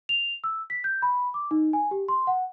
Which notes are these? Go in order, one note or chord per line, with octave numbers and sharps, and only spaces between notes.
F7
E6
B6
G6
B5
D6
D#4
G#5
G4
C6
F#5